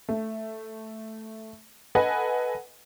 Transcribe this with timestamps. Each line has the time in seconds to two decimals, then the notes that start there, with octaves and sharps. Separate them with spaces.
0.09 A3
1.95 A4 B4 D#5 F#5 G#5